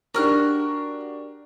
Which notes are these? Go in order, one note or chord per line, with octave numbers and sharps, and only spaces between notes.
D4 F#4 G4 A#4 F6 F#6